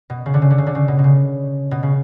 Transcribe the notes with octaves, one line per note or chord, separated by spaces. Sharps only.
B2
C#3
D3
C#3
D3
C#3
D3
C#3
B2
B2
C#3
B2
C#3